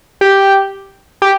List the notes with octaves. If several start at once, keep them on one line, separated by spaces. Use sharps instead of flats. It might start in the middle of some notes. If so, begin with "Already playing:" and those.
G4
G4